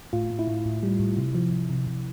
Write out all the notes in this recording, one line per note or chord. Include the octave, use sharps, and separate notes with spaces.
A2 F4
A2
E4
A2
A2
G3
A2
C3
F3
F3
C3
C3